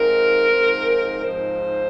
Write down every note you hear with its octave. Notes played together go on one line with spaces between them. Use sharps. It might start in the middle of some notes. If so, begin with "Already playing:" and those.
Already playing: G#2 F3 C4 D#4 A#4
G#2 F3 C4 D#4
G#2 F3 C4 D#4 C5